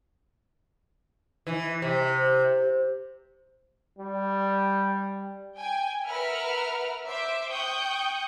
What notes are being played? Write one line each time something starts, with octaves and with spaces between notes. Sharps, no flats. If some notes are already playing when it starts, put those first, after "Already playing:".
E3
C3
G3
G5 G#5
A#4 B4 E5 F#5 F6
C5 E5 D6
G5 C#6 D#6 F#6 G6